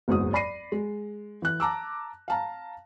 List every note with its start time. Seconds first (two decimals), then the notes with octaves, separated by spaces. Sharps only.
0.08 F#1 E2 G#2 F#3 D#6
0.33 D5 B5 A#6 C7 D#7
0.72 G#3
1.42 E3 F#6
1.60 A5 A#5 D6 E6
2.28 F5 A5 A#5